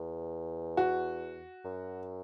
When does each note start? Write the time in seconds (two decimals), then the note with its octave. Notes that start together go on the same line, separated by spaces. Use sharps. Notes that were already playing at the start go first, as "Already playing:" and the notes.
Already playing: E2
0.77 F#4
1.65 F#2